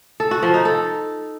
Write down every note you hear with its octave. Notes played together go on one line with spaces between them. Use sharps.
A4
F#4
F3
D#4
A4